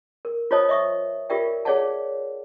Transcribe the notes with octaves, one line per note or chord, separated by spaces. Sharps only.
A#4
F4 C5 C#5 D#5 A5 D#6
D#5 E5 C#6 D#6
F4 G4 A#4 D5 E5 G5
G#4 C#5 D5 F5 F#5 A5